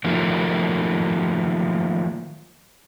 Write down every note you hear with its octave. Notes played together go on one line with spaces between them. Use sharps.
D#3 F3 F#3 A3 A#3